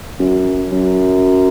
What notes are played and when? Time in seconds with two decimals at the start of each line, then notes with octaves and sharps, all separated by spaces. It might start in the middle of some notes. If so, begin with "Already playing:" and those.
0.19 F#2
0.72 F#2